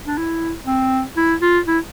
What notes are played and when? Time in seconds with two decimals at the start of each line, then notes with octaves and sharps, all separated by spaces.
0.07 D4
0.18 E4
0.67 C4
1.17 E4
1.42 F4
1.67 E4